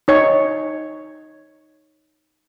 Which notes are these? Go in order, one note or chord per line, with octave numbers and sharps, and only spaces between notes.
D#4 C#5